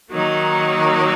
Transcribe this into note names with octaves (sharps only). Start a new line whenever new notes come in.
D#3 F#3 A#3 D#4